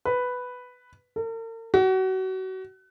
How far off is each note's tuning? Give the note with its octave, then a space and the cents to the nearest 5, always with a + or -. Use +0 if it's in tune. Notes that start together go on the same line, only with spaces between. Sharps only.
B4 +5
A#4 -45
F#4 +30